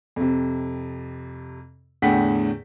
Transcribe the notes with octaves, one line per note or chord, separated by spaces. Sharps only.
F2 C3
E2 A2 D3 F#5 G5 B6